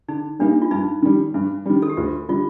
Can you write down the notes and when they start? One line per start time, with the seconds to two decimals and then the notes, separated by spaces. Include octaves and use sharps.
0.08 D3 D#4
0.39 G3 A#3 D4 D#4
0.62 F4
0.71 G2 D#4
1.02 D#3 G3
1.34 G2
1.66 D#3 G3
1.82 A4
1.90 G4
1.97 D2 F4
2.29 D3 G3 F4